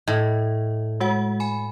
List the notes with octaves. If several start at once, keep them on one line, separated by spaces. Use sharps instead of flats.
A2 D#5
G#3 F#4 F#5
G#5 B5